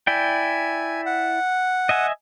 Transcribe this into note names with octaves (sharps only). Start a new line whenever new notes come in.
E4 D5 G5 G#5
F#5
D#5 E5 G#5